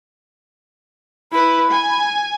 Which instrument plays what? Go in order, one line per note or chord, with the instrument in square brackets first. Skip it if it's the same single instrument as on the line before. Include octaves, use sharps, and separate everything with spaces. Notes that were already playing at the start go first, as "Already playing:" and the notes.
[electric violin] E4 B4 [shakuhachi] B5
[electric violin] G#5